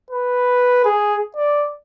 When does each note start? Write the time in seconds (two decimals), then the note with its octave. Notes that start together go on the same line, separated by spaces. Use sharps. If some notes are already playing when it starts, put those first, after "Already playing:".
0.10 B4
0.85 G#4
1.36 D5